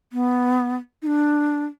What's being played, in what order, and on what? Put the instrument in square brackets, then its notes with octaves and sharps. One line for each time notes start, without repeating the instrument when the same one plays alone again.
[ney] B3
D#4
D4